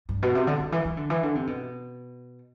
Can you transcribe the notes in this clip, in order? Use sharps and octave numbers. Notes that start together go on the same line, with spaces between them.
G2
B2
C3
D3
D3
E3
E3
D3
E3
D3
C3
B2